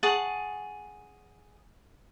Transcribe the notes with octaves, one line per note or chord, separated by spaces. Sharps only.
G#4 F#5 A5 C#6